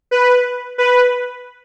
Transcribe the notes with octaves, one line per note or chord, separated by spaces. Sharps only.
B4
B4